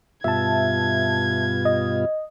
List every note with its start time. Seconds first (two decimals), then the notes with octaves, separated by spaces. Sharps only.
0.24 G2 B2 F4 E5 A5 G#6
1.65 D#5